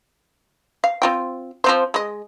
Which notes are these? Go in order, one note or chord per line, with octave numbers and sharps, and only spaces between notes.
F5
C4 F4 G5
F3 C4 C5
G#3 D#5